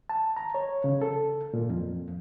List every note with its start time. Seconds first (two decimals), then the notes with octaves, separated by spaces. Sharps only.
0.09 A5
0.37 A#5
0.54 C#5
0.84 C#3
1.02 A4
1.54 A#2
1.70 F2